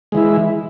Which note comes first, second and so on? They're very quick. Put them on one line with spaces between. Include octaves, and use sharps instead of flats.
G#3 E3 E4